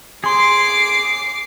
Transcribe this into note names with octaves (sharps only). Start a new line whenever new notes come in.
G#4 C6 D6 C7